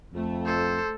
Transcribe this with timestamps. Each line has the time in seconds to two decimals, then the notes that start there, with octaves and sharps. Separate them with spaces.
0.13 F2 A3
0.46 A4 C5